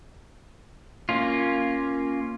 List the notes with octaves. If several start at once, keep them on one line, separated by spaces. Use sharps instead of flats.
A#3 C#4 F4